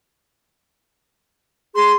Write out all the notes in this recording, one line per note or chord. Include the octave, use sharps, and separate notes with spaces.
G#4 C6